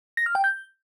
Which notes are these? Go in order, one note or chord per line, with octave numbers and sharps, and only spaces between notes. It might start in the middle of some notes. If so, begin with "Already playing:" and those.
A#6
F6
G5
G6